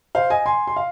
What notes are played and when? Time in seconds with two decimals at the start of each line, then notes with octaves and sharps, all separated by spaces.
0.15 C5 F5
0.30 D#5 G#5
0.46 G#5 C6
0.67 C6
0.76 F5